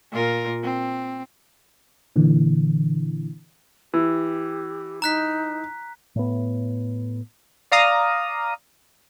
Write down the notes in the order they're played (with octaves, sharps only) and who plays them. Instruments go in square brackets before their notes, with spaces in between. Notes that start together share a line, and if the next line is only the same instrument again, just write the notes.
[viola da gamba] A#2 F4 A#4
C4
[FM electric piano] A#2 D3 E3
[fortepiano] E3 [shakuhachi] G4
[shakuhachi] D#4 [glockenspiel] A#5 F#6 B6
[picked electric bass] A2 B3
[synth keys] D5 F5 A#5 D#6